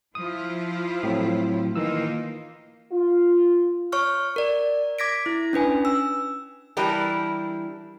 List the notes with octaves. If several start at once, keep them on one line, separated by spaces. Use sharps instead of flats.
F3 E4 F4 D#6
A2 F#3 C4
D#3 E3 A#3 D#4 F4 E6
F4
C#5 C#6 F6
A#4 D5
D6 G#6 A#6 B6 D7
E4
C#4 D4 B4 G#5
E6
E3 G3 D4 E4 G4 A#4